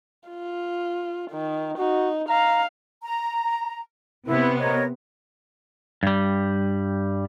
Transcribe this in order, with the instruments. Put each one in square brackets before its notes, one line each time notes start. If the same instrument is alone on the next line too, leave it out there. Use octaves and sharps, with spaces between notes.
[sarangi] F4
D#3
[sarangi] D#4 [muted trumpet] F#4
[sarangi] F5 [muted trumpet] A#5
[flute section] A#5
[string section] C3 B3 [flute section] E4
[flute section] A#4 C#5 D#5
[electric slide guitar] G2 G3